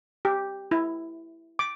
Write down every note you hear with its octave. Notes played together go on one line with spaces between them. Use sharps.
G4
E4
D6